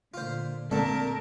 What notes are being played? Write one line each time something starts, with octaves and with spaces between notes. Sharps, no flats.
A#2 D3 F4 C5
A#2 D3 G#3 A3 C4 A#4 A5